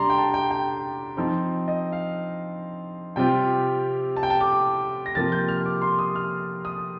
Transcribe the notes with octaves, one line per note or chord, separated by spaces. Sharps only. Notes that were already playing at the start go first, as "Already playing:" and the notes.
Already playing: C3 G3 D4 A#5 C6
G5
A5
G5
G5
F3 C4 D#4
D#5
F5
C3 G3 C4 F4 G5
A5
G5
A5
D6
A#6
C3 F3 A#3 F4 A6
G6
F6
D6
C6
D#6
F6
D#6